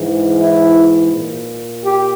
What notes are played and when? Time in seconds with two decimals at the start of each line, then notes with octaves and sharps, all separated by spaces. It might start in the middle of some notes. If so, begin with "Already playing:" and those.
Already playing: G#2 E3
0.40 E4
1.13 A#2
1.85 G4